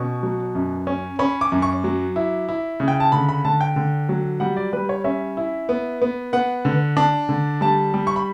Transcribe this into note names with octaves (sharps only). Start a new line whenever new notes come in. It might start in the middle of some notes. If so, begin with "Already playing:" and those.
Already playing: B2 C#4 C#6
F#3
F#2
C#4
C#4 B5
D6
F#2
C#6
F#3
E4
E4
C#3
G5
A5
D3 B5
B5
D3 A5
G5
D3
F#3
G3 F#5
D5
G3 B4
C#5
C#4 E5
E4
B3
B3
B3 F#5
D3
D4
D3
G3 A5
G3
C#6
B5